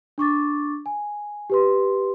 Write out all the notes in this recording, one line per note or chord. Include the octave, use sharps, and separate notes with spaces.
D4 C#6 D6 A6
G#5
G4 B4 C6